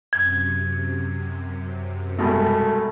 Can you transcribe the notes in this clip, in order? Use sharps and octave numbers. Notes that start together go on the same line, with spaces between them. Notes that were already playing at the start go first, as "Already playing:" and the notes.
F#2 C3 G#6
C2 G#2 B2 A3